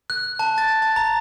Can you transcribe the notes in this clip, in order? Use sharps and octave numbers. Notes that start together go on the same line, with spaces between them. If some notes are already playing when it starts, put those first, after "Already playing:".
F#6
A5
A6
A5
A#5